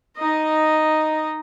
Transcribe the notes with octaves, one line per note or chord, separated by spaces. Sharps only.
D#4 D#5